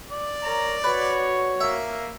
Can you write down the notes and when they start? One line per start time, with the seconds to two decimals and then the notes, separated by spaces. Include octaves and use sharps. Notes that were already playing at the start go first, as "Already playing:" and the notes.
0.11 D5
0.43 A#4 C#5 A#5
0.84 F#4 B4 C#5
1.60 A#3 E5